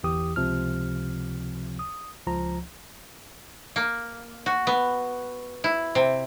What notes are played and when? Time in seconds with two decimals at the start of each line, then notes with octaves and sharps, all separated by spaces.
0.03 G1 E2 E3 G4 D#6
0.36 C#2 C3 F3 F6
1.79 D#6
2.26 C#2 F3 A#5
3.76 A#3
4.46 F#4
4.67 B3
5.64 E4
5.95 C3